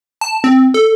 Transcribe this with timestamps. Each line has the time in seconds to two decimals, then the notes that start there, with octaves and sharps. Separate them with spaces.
0.21 A5
0.44 C4
0.74 A4